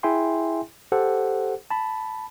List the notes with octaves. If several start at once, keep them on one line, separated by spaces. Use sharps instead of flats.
E4 G#4 E5 G5 G#5 C6
G4 A4 C5 F#5
A5 B5